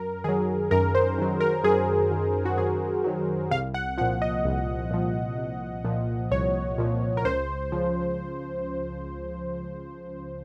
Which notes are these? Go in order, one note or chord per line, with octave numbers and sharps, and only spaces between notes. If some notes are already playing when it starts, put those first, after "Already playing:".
Already playing: F#2 A#4
D#3 F#3 G#4
F#2 A#4
C5
D#3 F#3
A#4
F#2 G#4
D#3 F#3
F#4
F#2 G#4
D#3 F#3
C2 F5
F#5
A#2 F3 F#5
D#5
C2
A#2 F3
C2
A#2 F3
C2 C#5
A#2 F3
A#4
C#2 C5
C#3 F3